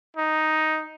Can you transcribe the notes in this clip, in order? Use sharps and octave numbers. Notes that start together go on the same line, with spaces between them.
D#4